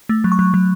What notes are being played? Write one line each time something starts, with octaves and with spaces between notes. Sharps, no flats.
A3
F#3
C#6
F#3
F#3